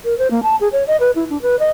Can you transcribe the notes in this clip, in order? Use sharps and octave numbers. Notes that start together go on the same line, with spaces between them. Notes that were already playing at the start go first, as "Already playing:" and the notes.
A#4
C5
A#3
A5
G#4
C#5
D#5
B4
E4
D4
B4
D#5